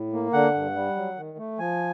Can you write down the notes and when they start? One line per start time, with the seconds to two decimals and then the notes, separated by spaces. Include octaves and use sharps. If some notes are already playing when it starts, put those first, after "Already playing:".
Already playing: A2
0.13 A#3
0.33 D3 F#5
0.54 G2
0.75 G3
0.96 F#3
1.16 D#3
1.38 A3
1.58 F3 G#5